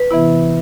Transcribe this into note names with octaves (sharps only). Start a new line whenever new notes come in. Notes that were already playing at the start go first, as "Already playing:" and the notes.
Already playing: B4
C3 E3 B3 E4